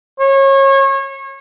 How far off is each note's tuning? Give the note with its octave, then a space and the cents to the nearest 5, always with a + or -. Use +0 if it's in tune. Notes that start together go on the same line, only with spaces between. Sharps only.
C#5 -30